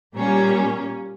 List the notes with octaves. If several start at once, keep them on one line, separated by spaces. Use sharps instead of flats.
A#2 G3 A#3 C#4